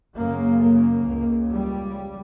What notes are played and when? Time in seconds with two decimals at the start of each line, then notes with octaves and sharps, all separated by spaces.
0.15 F#2 C#3 A#3
0.61 A#3
1.06 C#2 C#3
1.51 G3